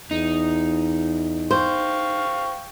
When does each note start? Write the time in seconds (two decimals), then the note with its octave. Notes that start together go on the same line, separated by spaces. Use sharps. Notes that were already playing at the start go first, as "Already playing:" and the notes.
0.11 E2 D#4
1.51 C5 F5 G5 C#6